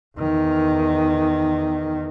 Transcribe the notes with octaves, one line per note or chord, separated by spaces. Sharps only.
E2 D#3